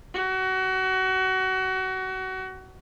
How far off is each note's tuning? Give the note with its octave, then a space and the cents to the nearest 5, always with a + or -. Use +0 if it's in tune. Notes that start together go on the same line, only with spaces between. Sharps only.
F#4 +25